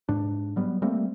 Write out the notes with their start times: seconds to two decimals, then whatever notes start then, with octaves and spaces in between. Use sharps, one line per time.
0.09 G#2 D4
0.56 F#3 G3 B3
0.82 G3 A3 A#3 C4